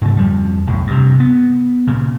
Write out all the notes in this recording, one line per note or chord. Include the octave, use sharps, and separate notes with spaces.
G#2 C#3 A3
F2 F3 G3
B1 A2
G2 C3
B3
A#2 C#3